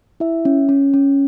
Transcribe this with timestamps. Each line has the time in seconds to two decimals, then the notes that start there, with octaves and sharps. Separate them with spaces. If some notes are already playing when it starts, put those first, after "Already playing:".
0.20 E4 E5
0.45 C#4
0.69 C#4
0.94 C#4